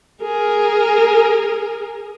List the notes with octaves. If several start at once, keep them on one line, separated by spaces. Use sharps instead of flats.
G#4 A#4